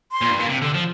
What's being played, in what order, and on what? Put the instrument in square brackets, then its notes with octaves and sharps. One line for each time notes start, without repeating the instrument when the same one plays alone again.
[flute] C6
[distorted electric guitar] A#2
G2
A#2
C3
D3
F3